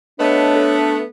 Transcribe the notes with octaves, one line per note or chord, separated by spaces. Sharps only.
A3 B3 D4 C#5 D#5
A4